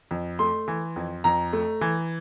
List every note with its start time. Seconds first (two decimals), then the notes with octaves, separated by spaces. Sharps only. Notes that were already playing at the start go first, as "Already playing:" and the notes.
0.11 F2
0.39 A3 C6
0.68 E3
0.96 F2
1.24 F2 A#5
1.53 A3
1.81 E3